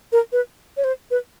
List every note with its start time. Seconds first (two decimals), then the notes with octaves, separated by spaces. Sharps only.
0.12 A#4
0.32 B4
0.77 C#5
0.84 C5
1.11 B4